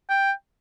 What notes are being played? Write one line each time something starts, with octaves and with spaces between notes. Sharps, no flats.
G5